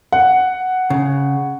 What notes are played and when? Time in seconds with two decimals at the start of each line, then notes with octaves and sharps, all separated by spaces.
0.12 F#5
0.90 C#3